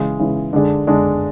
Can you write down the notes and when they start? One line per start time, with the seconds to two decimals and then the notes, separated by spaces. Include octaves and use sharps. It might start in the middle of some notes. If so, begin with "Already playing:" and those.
Already playing: C#3 E3 G#3
0.19 C#3 E3 G#3
0.53 D3 G#3 D4 G#4
0.87 D3 G#3 D4 G#4